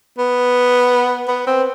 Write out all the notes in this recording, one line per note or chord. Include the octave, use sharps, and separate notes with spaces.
B3
B3
C4